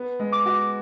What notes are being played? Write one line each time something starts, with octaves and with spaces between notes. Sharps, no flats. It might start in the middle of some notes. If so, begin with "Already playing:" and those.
Already playing: B3
G#3
D6
F#4